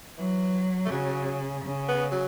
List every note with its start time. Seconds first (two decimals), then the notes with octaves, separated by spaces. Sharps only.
0.18 E3 F#3
0.85 A3
0.91 C#3 F#3
1.64 C#3
1.89 B3
2.12 F#3